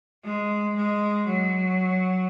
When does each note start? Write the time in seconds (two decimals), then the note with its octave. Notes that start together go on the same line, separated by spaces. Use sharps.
0.24 G#3
0.76 G#3
1.27 F#3